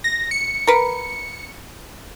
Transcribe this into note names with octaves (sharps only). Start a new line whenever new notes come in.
A#6
C#7
A#4 B4